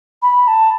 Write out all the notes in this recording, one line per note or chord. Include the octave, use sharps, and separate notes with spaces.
B5
A5